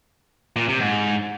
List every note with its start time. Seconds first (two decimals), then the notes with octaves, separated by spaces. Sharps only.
0.56 A#2
0.68 C3
0.80 G#2